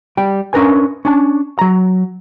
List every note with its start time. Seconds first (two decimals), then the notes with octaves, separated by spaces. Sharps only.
0.17 G3 G5
0.53 C#4 D4 A#4 B4 G#5
1.05 C#4 D4 A5
1.59 F#3 A#5